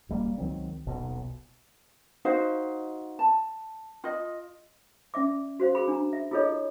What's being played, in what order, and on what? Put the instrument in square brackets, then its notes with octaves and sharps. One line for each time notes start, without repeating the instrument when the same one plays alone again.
[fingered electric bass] D#1 G3 G#3 A#3
C#2 D#3 F#3 C4
D#1 B1 B2
[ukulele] D#4 F#4 C5 F5
A5
F4 D#5
[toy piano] C#4 D5 E5 D6
F#4 C5 F5
G#4 B5
D4 A#5
E5
E4 F4 G#4 A4 C#5 D#5